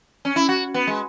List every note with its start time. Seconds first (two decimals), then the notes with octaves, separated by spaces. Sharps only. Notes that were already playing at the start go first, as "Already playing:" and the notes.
0.25 C#4
0.36 E4
0.49 F#4
0.74 B3
0.87 G#3